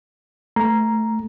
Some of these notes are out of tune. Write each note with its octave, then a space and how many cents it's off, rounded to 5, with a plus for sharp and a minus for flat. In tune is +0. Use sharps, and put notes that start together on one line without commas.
A3 +0 A#5 +5